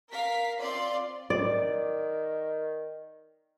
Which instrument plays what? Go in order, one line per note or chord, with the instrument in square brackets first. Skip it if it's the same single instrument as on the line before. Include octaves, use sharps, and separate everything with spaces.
[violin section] A#4 F5 B6
C4 F4 D5 C6
[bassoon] D#3 [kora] D5